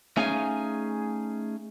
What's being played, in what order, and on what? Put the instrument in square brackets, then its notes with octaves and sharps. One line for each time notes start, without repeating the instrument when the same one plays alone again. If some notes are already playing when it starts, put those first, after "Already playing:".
[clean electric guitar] A3 C#4 D#4 G#4 F5 G#5